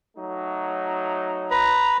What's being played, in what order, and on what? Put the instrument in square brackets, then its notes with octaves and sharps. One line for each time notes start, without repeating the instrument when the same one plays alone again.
[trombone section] F#3 A3 D#4
[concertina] B4 [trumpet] A#5